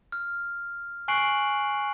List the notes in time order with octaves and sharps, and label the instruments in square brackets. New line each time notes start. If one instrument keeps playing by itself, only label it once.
[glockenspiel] F6
G#5 C#6 F#6 C7 D7 F#7